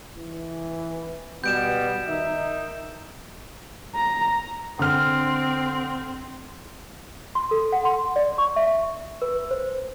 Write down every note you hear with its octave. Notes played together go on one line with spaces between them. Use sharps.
E3
B2 G3 B3 G6 D7 E7
D#3 D#4 E5
A#5
D3 C4 F6
C6
A4
F#5
C6
D5
C#6
E5
B4
C5